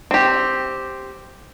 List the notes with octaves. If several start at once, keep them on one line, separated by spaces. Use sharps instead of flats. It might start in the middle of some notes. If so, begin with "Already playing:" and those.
C4 G4